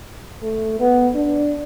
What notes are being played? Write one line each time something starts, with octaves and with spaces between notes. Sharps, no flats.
A3
B3
D4